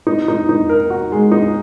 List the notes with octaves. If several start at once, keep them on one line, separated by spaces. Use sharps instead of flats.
D#4
D#4
D#4
A#4
F#4
G#3
D#4